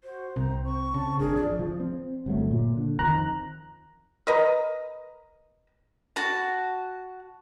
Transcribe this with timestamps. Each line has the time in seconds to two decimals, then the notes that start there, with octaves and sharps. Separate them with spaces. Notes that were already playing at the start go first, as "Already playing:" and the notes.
0.04 F#4 C5
0.36 C2 C4 A#5
0.65 C#6
0.94 C#3 A5
1.19 G#1 D4 G#4 A#4
1.36 F3 D5
1.59 F3
1.80 C4
2.26 G1 F#3 A3
2.51 A#2
2.77 D3
2.99 F2 D#3 F3 A#5 F#6
4.27 A#4 B4 D#5 A#5
6.16 F#4 A5